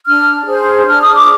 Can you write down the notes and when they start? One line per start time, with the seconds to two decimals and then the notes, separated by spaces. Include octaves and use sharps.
0.06 D4 F6
0.47 G#4 C5
0.87 D4 F6
1.01 D#6
1.14 D6